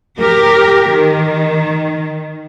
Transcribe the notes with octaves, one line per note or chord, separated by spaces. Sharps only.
G4 A#4
D#3